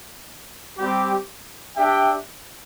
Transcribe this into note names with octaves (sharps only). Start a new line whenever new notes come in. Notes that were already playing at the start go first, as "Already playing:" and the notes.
G3 C4 G4
D4 G4 E5 G5